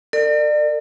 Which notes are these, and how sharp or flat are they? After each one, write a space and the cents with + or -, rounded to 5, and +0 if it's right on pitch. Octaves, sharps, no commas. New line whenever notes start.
A#4 -45 D5 +30